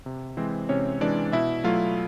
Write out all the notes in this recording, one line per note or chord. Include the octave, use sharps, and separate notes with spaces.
C3
E3 G#3 C4 C5
C3 C#4 C#5
E3 G#3 D4 D5
B2 E4 E5
F#3 A3 F4 F5